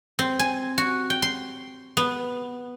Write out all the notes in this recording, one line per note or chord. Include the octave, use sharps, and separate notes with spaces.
C4
G#5
F#4
G5
C6
B3